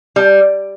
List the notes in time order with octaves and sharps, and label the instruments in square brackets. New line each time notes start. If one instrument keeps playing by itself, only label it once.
[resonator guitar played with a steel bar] G3